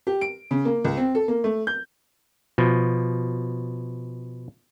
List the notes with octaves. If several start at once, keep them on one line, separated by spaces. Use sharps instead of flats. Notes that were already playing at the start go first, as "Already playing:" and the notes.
G4
D7
C#3
A#3
C#2
C4
A4
A#3
A3
G6
B2 F3